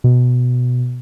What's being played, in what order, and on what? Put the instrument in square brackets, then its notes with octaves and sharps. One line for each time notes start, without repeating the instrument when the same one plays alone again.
[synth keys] B2